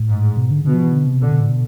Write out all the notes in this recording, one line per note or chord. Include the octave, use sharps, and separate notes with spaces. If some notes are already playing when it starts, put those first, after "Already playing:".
Already playing: A2
G#2
B2
D3
B2 D3
F3
E3
D3
C3
B2 D3
B2
A2
B2